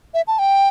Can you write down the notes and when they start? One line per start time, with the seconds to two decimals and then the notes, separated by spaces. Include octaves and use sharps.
0.14 E5
0.27 A5
0.39 G5